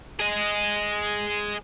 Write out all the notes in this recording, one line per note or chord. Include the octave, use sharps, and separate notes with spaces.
G#4 D#5